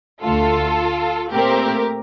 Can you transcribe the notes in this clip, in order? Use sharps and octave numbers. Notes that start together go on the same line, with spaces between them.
D2 D3 A3 F4 A4
A#2 A3 C4 G4 A#4